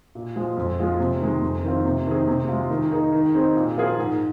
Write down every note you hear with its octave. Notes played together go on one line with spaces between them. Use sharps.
A#2
F3 G#3
F2
F3 G#3 F4 G#4
C3
D#3 G#3
F2
D#3 C4 F4
C3
D#3 C4 G#4
C3
G#3 F4
D#3
A#3 D#4 G#4
D#3
C4 D#4 G#4
A#2
F3 A#3 F4 G#4
G#2